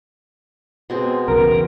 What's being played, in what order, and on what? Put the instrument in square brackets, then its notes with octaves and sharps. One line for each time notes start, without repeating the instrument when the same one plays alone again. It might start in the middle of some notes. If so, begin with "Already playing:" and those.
[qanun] B2 G#3 C4
[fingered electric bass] B1 E2 C#3 [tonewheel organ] A#4